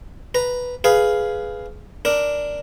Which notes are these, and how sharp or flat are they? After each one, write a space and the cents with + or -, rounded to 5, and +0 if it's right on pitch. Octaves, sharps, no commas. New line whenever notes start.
B4 +0 A#5 +0
G#4 +10 B4 +5 F5 +0
D4 +0 A#4 +0